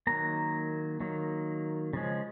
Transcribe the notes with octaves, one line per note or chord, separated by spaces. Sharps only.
D#3 F#3 A#3 A#5
D#3 F#3 A#3
C#3 F3 G#3 C#4